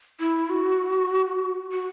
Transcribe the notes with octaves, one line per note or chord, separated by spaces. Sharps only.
E4
F#4
F#4